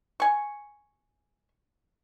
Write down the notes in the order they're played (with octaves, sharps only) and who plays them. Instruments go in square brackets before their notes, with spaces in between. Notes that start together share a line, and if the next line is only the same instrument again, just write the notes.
[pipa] G#5 C#6